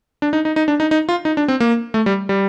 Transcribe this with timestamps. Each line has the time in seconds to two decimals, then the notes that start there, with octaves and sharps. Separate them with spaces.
0.22 D4
0.33 D#4
0.45 D#4
0.56 D#4
0.68 D4
0.80 D#4
0.91 D#4
1.09 F4
1.25 D#4
1.37 D4
1.48 C4
1.60 A#3
1.94 A3
2.06 G3
2.29 G3